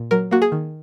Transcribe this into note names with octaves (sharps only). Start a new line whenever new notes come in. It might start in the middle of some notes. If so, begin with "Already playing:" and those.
Already playing: A#2
F#3 A#4
A#3 F#4
G#4
D#3